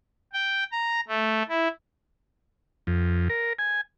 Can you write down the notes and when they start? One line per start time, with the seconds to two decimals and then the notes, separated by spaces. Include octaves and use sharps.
0.33 G5
0.72 A#5
1.08 A3
1.49 E4
2.87 F2
3.30 A#4
3.59 G#5